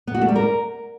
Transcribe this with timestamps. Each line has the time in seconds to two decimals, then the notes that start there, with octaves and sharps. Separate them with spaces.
0.07 B3
0.14 F#4
0.22 A3
0.29 G3
0.36 A#4